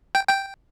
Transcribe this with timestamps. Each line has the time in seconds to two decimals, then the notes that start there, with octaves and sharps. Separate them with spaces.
0.15 G5
0.29 G5